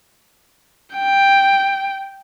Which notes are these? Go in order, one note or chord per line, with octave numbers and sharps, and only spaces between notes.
G5